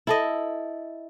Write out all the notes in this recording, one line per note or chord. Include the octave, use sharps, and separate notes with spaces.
E4 A4 D#5